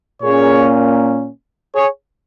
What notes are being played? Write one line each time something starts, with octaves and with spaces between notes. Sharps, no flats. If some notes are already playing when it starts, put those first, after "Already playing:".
A#2 A#3 C#4 G#4 C#5
G#4 C#5